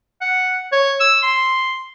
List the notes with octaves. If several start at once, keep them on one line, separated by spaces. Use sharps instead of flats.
F#5
C#5
E6
C6